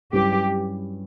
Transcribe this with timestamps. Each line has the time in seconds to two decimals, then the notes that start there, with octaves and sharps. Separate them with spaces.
0.13 G2 F#3 C#4 E4 G4 B4